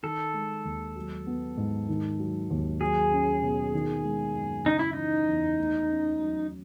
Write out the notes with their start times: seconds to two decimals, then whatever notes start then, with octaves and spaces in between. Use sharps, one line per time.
0.03 D#3 A4
0.34 G#3
0.65 D#2
0.96 F#3
1.27 B3
1.57 G#2
1.89 D#3
2.19 F#3
2.51 D#2
2.81 F#3 G#4
3.12 C#4
3.42 B2
3.74 D#3
4.04 G#3
4.35 F#2
4.65 C#3 D#4
4.79 E4
4.93 E3 D#4
5.28 E2
5.58 A3
5.89 C#4
6.19 F#3